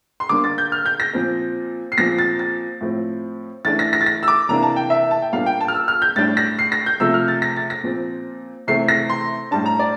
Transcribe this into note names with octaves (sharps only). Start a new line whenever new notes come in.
C6
D3 G3 A#3 D4 D6
A6
G6
F6
G6
A#6
A#2 F3 C4
C7
A#2 F3 C4 A#6
A6
A6
A2 F3 C4
E3 A3 D4 A6
A#6
A#6
A6
A#6
E6
D6
C3 E3 A#3 D4 A#5
A5
G5
E5
A5
G5
A#2 G3 A#3 D4 F5
G5
A5
F6
E6
F6
G6
A2 G3 D4 A6
A#6
C7
A#6
G6
C3 F3 A3 E6
F6
A6
A#6
A6
A#6
A#2 F3 C4
C3 E3 A3 C4 C7
A#6
C6
A2 G3 D4 A5
A#5
D5